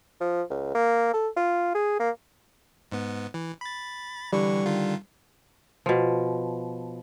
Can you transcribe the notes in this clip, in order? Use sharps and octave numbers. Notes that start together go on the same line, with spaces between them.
F3
C#2
A#3
A4
F4
G#4
A#3
G#2 B3
E3
B5 A6
D3 E3 G3 C#6
D3 D#3 F4
B2 F3